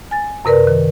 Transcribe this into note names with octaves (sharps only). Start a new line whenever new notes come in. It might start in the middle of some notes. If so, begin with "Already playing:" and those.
G#5 A6
F#2 C3 A#4 B4 D5
D#3